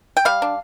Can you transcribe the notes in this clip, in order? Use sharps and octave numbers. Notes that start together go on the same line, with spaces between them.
G5
G3 F5
D4